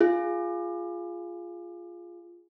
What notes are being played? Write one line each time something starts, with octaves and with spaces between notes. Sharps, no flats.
F4 G#4